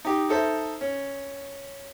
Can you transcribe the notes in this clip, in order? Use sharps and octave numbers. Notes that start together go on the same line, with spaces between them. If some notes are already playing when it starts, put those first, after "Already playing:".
D#4 G4
D#4 A4 C5 E5
C#4